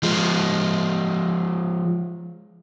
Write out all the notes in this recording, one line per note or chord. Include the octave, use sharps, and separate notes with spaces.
F3 G#3